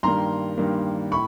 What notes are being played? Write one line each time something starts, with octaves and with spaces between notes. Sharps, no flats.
G2 D#3 G3 A#3 A#5 C6
G2 D#3 G3 A#3
A2 B5 C#6